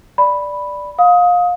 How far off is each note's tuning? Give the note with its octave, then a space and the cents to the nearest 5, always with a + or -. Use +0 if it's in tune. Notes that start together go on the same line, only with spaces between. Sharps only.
D5 +0 B5 +0
F5 +25 D#6 +20